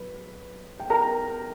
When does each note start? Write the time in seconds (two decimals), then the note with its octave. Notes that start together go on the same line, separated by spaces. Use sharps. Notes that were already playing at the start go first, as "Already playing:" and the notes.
Already playing: F#2 B4
0.80 G5
0.90 A#4 A#5